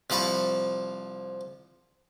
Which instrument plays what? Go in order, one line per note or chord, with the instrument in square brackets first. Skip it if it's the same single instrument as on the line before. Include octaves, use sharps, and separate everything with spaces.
[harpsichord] C2 F3 A5 B5 C#6